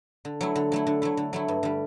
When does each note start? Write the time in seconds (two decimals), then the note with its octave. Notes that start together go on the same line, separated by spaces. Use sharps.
0.25 D3
0.41 F#3 A3 E4
0.56 D3
0.72 F#3 A3 E4
0.87 D3
1.02 F#3 A3 E4
1.17 D3
1.33 F#3 A3 E4
1.48 G2
1.63 D3 G3